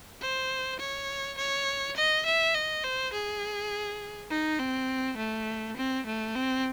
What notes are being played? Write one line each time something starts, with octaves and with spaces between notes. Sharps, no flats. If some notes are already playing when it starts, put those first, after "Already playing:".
C5
C#5
C#5
D#5
E5
D#5
C5
G#4
D#4
C4
A3
C4
A3
C4